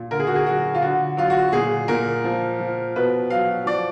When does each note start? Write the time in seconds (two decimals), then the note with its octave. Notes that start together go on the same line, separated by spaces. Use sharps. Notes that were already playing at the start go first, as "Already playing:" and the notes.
Already playing: A#2
0.11 D3 A#4
0.20 G#4
0.27 F#4
0.35 G#4
0.46 F#3 F#4
0.75 F4
0.82 D3 F#4
1.17 F#3 F4
1.30 F#4
1.52 A#2 G#4
1.88 A#2 A#4
2.24 F3
2.60 F3
2.96 B2 B4
3.30 F#3 F5
3.66 F3 D5